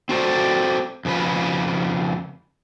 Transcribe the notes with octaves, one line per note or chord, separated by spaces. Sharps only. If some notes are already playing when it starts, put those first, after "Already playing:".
C4 F#4 A4 C5 D5
F2 C#3 B4